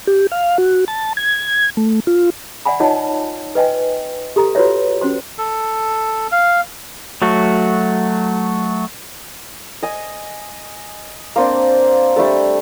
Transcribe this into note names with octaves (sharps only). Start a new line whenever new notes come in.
G4
F5
F#4
A5
G#6
A3
F4
D5 E5 F#5 G#5 B5
D#4 F4 C#5 D#5 F#5 A5
B4 D#5 G5 G#5
G4 A4 A#5
F4 F#4 B4 C#5 E5
C#4 F#4 C5 C6
A4
F5
F#3 A3 F#4
D#5 G#5
A#3 C4 D4
G3 A3 D4 A4